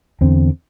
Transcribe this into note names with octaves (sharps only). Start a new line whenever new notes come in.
E2 D3 C4